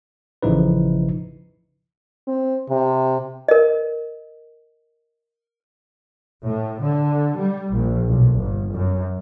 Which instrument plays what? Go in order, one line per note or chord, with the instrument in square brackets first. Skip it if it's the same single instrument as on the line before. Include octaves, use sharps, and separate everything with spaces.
[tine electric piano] A1 C#3 F3 D#4 E4 B4
[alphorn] C4
C3
[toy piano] A#4 D#5
[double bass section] A2
D3
G3
A#1
B1
G1
F#2